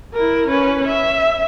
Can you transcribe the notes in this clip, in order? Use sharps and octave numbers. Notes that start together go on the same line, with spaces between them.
E4 A#4
C#4 B4
E5